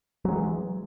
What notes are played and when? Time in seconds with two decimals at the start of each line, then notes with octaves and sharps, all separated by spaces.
0.25 F#3
0.28 G#3
0.31 E3